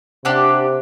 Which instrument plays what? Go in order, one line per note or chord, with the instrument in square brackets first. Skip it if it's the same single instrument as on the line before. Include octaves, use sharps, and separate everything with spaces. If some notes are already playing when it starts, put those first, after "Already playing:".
[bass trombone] C3 [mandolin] D4 G4 F#5